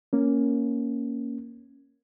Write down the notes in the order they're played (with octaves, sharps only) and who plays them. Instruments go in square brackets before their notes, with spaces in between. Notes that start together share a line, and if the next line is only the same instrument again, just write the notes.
[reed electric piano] A#3 C#4